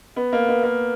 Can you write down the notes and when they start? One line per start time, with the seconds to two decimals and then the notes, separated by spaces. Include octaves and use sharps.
0.16 B3
0.33 A#3
0.49 B3
0.63 A#3